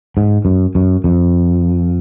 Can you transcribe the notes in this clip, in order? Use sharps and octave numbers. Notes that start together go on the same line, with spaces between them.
G#2
F#2
F#2
F2